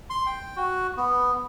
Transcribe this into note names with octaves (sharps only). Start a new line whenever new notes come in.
C6
G5
F#4
B3